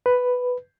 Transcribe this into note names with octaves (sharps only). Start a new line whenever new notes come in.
B4